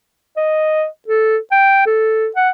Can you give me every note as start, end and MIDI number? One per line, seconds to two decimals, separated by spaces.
0.37 0.86 75
1.08 1.37 69
1.52 1.85 79
1.86 2.28 69
2.36 2.50 78